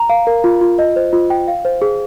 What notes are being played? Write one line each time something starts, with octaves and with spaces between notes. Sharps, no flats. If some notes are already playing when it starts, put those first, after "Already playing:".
Already playing: A#5
F5
A#4
F4
F4
D#5
C5
F4
G5
F5
C5
G#4